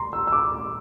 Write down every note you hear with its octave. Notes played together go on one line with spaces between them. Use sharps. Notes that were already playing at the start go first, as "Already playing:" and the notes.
Already playing: A#2 A#5 C6
E6
E6
D6